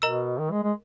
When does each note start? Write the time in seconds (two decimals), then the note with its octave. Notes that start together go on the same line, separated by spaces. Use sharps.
0.02 B2 A#4 D#5 A#5 E6
0.39 D#3
0.51 G#3
0.63 G#3